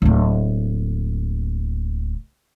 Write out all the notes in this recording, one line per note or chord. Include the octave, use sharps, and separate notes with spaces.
D1 A#3